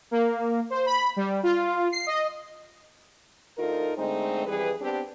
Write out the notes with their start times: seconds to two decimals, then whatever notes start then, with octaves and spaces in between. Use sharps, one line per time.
0.11 A#3
0.70 C5
0.86 B5
1.16 G3
1.43 F4
1.92 C7
2.06 D#5
3.58 D2 D#4 F4 A4 A#4
3.97 D3 G#3 A3 C4 D#4 C5
4.47 F2 E3 G3 G#4 B4
4.81 B3 C4 D4 G4